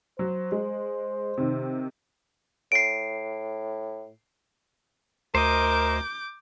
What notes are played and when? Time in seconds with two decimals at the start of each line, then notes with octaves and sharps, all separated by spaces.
0.19 F#3 C5
0.52 G#3
1.37 C3 D#3
2.72 A2 C7 D7
5.35 D2 A#4 C5 D#5 D6 G6